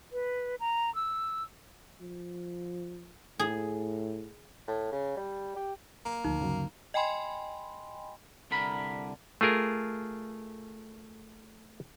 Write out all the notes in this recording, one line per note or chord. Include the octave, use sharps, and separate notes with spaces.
B4
A#5
E6
F3
A2 G#4
A2
C#3
G3
G4
F#3 A#3
D2 F3 D#4
G2 C#3 F#3
D#5 G5 G#5 B5 C6
C2 D3 A#4 B5
A3 F4 G#4 A#4